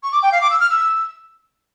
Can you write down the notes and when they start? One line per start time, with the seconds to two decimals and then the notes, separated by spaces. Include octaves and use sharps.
0.03 C#6
0.12 D6
0.23 G5
0.32 F5
0.41 D6
0.51 E6
0.60 F6
0.70 E6